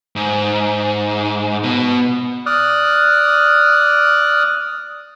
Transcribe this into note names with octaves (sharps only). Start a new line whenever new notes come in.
G#2
B2
D5 D#6 F6 F#6